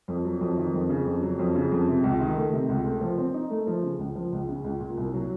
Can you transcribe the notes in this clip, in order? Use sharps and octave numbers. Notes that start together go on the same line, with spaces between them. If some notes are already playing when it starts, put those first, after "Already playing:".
F2
F#3
F2
D#3
F2
C#3
F2
F#3
F2
C#3
F2
C3
C#2
D#3
A3
C3
C#2
A3
F3
C4
D#4
A3
F3
C#3
C#2
F3
C#2
C#3
C#2
A#2
C2
F#3